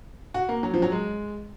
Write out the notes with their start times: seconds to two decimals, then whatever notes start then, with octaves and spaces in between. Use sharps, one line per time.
0.34 F#4
0.49 A#3
0.63 F#3
0.74 F3
0.82 F#3
0.92 G#3